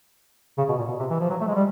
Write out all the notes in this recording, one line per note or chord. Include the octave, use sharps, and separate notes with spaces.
C#3
B2
A#2
B2
C3
E3
F3
F#3
A3
G#3
G3